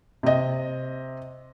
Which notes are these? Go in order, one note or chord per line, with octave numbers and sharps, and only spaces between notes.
C3 D#5